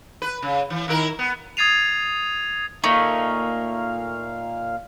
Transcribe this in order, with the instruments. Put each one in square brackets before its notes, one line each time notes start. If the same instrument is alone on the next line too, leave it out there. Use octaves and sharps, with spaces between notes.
[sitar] B4
C#3
E3
D#3 E4 A#4
B3
[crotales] D#6 G#6 A6 C7 D#7 F7
[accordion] A#2 F5 [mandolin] A3 [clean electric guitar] A#3 D#4